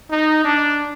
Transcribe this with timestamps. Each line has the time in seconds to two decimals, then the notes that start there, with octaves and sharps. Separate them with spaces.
0.10 D#4
0.44 D4